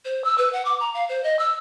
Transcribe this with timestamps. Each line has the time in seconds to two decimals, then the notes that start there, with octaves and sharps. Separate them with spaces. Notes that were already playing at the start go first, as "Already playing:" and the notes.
0.05 C5
0.24 E6
0.38 B4
0.53 F#5
0.65 D6
0.80 A#5
0.94 F5
1.09 C5
1.23 D#5
1.39 E6